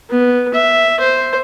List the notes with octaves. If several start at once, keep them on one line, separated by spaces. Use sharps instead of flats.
B3
E5
C5